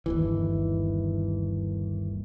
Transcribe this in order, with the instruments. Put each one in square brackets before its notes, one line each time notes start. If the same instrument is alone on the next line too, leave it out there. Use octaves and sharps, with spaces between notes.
[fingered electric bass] G1 D#2 E3